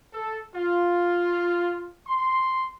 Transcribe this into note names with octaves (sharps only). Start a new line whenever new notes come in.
A4
F4
C6